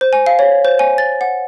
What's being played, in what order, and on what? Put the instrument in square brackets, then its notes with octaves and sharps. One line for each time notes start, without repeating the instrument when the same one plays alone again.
[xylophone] C5
G#5
F5
C#5
C5
G#5
A6
F#5